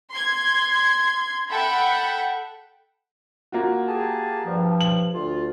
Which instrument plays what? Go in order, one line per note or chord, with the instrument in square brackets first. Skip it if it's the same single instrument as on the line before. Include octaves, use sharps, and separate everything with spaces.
[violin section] C6 G#6
A4 E5 F#5 G5 B5
[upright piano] A#3 F4 F#4
[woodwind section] G4 G#4 A5
G2 F3
[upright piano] F#7
[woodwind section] D2 F4